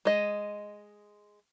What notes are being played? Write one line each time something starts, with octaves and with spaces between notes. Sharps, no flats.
G#3 D#5